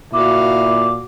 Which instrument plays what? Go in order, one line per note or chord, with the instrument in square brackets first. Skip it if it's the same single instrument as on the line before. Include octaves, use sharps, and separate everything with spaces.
[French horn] A#2 [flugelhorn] E4 [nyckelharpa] F#4 F5 [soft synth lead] D6